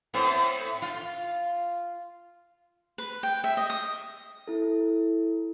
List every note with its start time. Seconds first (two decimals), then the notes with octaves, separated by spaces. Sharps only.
0.14 A2 B3 C4
0.82 F4
2.98 B4
3.23 G5
3.44 E5
3.57 D#5
3.70 D#6
4.48 E4 A4